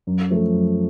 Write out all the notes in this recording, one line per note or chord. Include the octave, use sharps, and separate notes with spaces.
F#2
F3 A3
F#2